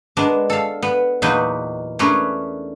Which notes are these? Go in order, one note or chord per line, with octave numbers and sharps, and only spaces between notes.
G#3 B3 D4 A#4
A4 F5
B3
E2 A#2 F#3 A#3 D#4 B4
A3 C#4 D4 G#4 A#4 B4